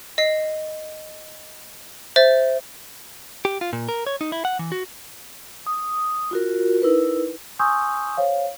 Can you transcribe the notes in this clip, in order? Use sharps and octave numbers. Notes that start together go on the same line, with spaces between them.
D#5 C7
C5 E5 A6
G4
F4
A#2
A#4
C#5
D#4
E4
F#5
E3
F#4
D#6
F4 F#4 A#4
D#4 E4 A#4 B4
G#5 C6 C#6 D#6 E6 G6
C5 C#5 F5